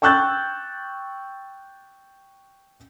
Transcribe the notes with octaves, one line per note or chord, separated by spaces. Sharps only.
G5 C#6 E6 F#6 G6 A6